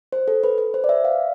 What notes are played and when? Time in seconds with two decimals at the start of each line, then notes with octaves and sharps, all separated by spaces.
0.13 C5
0.28 A4
0.43 B4
0.58 B4
0.74 C5
0.84 D5
0.89 E5
1.05 F5